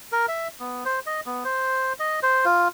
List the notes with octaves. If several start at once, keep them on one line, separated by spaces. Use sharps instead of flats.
A#4
E5
B3
C5
D#5
B3
C5
D#5
C5
F4